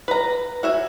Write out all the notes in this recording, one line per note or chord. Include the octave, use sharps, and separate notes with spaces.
B4 A#5
F#4 E5 G#5